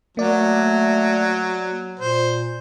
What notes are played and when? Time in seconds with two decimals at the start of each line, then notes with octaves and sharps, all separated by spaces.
0.17 F#3 A3 A#3 D5
1.99 A#2 C5